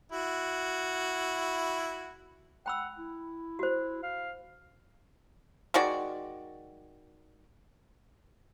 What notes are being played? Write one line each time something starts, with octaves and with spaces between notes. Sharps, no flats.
E4 F#4
F#5 G5 B5 E6
E4
F#4 C5
F5
D#3 G#3 F#4 D5